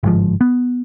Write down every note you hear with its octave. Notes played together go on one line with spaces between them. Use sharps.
G1 G#2 F3
B3